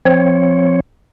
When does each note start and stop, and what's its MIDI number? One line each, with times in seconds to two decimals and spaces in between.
0.05 0.80 53
0.05 0.80 60
0.05 0.80 73